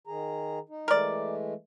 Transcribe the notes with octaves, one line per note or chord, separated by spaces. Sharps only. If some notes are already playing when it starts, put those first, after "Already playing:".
D#3 G#4 A#5
D#4
E3 G#3 A3 A#4 D5